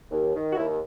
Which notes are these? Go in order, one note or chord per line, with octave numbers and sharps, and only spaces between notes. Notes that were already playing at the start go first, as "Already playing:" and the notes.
D#2
D#3
F#4
D#2 E4